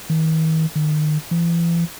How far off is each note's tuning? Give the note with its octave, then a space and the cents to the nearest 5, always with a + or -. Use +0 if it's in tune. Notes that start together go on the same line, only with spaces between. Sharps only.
D#3 +45
D#3 -35
E3 +40